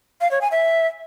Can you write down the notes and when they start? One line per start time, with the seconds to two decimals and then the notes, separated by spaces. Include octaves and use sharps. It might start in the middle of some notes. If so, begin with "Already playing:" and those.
0.21 F5
0.31 C#5
0.41 G#5
0.51 E5